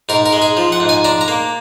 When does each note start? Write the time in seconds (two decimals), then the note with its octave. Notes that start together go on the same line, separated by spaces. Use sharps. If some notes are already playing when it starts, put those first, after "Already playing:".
0.09 G#2 A#4
0.26 A#4
0.33 G#3
0.42 G#4
0.57 F3
0.72 F#5
0.80 G#2
0.89 G#5
1.04 D4 A#5
1.21 A#5
1.28 A#3